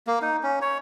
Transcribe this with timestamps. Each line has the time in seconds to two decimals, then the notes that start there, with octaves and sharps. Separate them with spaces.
0.07 A#3
0.22 D#4
0.43 C#4
0.62 C#5